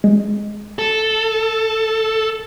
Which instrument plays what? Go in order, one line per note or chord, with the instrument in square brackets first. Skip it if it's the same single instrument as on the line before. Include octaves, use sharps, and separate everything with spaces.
[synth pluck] G#3
[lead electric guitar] A4